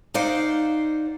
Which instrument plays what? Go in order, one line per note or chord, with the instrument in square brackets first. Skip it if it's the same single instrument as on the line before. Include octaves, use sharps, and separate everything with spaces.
[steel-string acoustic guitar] D#4 C5 D5 F5 F#5